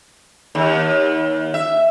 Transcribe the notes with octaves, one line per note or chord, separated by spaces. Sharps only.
D#2
E5